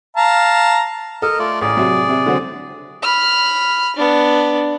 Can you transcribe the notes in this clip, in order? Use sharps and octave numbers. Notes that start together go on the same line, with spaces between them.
F5 A5 A#5
A4 A#4 D#5
A3 F4 D5
A1 G#4 D5
C3 F#3
C3
D3 F#3 C4
B5 F6
B3 D4